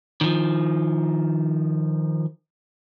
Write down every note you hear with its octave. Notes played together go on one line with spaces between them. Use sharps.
D#3 F3